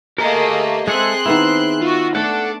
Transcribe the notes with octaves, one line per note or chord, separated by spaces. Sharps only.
A3 A#3 G4 G#4 A#4 D#5 A#5
G#3 C4 G#4 A4 E5 C6 F#6
D#3 B3 E4 E5
F4 F#4
A3 D4 A4 F#5